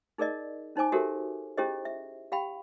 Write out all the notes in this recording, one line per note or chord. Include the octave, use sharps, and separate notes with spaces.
D#4 G#4 A#4 D5 D#5
C#4 D#4 C5 G#5 D6
F#4 G4 A4 A#4 C5 E5
C#4 E4 G4 G#4 C5 D#5
E5
G4 F5 G5 B5